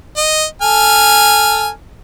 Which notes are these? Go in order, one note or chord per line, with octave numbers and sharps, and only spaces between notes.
D#5
A4 G#5 F6